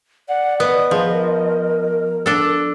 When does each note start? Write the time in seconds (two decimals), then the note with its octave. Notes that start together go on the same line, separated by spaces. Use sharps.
0.28 D5 F#5
0.60 B3 D#5
0.91 F3 G#4
1.11 A#4
2.26 D4 A4